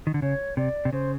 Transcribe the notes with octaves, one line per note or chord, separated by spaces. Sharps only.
D#3
D3
C#3 C#5
C3 D5
C3
C#3 C5